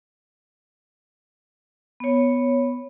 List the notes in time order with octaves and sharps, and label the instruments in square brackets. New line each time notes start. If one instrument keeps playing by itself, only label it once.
[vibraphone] B3 C#5